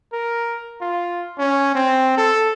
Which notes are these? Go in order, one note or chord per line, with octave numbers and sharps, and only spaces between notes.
A#4
F4
C#4
C4
A4